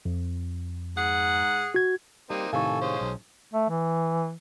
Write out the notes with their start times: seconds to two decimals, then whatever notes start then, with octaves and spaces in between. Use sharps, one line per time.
0.05 F2
0.96 G#2 G#4 F#5
1.74 F#4 G#6
2.30 G3 A#3 C4 D#4
2.53 A2 C3 D#3 A4 F5 G#5 C#6
2.81 G#3 C#4 C5
3.01 B1
3.53 A3
3.70 E3